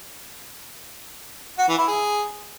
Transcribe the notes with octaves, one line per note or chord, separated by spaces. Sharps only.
F#4
E3
E4
G#4